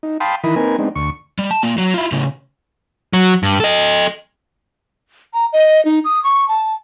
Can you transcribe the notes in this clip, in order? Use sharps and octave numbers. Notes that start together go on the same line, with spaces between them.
D#4
F5 G5 A5 B5 C6 D#6
D#3 E3 E4 A#4 B5 D#6
A#3 C4 D#4 A#4 B4 G#5
G#3 B3 C4 D4 D#4
D2 C#6
G3
A5
A#3 F4
F#3
E4 F4
A2 C#3
F#3
G2
A4 D#5
A#5
D#5
D#4
D#6
C#6
A5